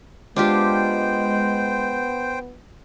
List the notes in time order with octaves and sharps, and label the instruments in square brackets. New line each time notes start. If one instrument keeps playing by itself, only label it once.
[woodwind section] G#3 [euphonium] B3 [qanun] D4 F4 G4 [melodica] C5 G5